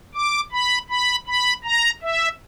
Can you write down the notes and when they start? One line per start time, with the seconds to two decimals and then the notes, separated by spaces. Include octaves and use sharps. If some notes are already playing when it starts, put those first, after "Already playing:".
0.15 D6
0.52 B5
0.90 B5
1.27 B5
1.64 A#5
2.02 E5